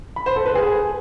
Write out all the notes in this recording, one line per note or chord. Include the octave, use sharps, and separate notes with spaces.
B5
C5
A4
B4
G#4